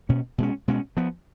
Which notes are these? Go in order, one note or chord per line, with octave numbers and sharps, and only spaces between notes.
B2 A#3 C#4
B2 G#3 C#4
B2 G#3 C#4
F3 B3